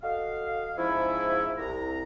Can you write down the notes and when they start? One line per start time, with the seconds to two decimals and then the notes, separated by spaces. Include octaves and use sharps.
0.02 F#4 A4 D#5 F5
0.77 G#2 F3 G#3 C#4 E4
1.58 C2 A#5